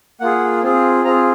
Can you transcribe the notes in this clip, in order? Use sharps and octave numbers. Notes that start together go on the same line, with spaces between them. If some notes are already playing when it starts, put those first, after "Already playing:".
A#3 F4 G#4 F#5
C4 F4 G#4
C4 F4 G#4 A#5